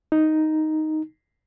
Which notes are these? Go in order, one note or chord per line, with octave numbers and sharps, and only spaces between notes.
D#4